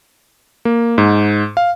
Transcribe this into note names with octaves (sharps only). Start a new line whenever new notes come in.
A#3
G#2
F5